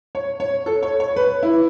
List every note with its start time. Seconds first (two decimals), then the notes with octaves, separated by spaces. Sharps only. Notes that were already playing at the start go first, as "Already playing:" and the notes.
0.15 C#5
0.40 C#5
0.66 A4
0.82 C#5
1.00 C#5
1.16 B4
1.43 E4